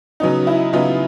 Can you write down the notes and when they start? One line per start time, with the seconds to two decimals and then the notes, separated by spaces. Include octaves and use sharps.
0.20 C#3 F#3 B3 D#4
0.47 E4
0.73 C#3 F#3 B3 D#4 F4